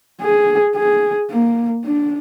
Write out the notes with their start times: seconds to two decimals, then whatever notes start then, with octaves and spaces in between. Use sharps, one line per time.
0.21 G#4
0.76 G#4
1.31 A#3
1.85 D4